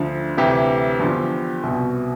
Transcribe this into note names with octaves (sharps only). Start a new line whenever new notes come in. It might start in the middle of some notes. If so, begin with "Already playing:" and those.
Already playing: D2 D3 F3
D2 C3 E3 G4
E2 D3 F3
C2 B2